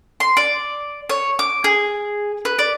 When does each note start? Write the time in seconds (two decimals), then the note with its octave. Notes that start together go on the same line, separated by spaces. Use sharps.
0.20 C6
0.37 D5
1.09 C#5
1.39 D6
1.64 G#4
2.45 B4
2.59 D5